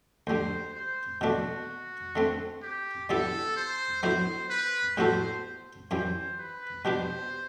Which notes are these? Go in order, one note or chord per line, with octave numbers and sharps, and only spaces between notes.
D2 D3 G3 C5
C5
B2 A3 D4 F#4
D3 A3 C4
G4
D3 G3 B3 E4 G4 A4
C5
D3 F#3 B3 E4 C5
B4
A2 G3 B3 F#4 A4 C5
F#2 E3 G3 C5
B4
B2 G3 D4 G4 B4 C5